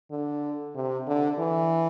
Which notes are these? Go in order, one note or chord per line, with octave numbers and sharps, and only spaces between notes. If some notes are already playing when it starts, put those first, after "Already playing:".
D3
C3
D3
E3